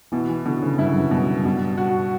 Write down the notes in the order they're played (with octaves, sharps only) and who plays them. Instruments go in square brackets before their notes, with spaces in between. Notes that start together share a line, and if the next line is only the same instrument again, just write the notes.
[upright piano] B2 [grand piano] E3
[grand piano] E3
[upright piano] B2 [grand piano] D3
[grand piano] C#3
[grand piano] G2 [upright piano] E4
[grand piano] F#2
G2
[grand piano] F#2 [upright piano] B2
[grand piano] G2 [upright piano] B2
[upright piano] F#4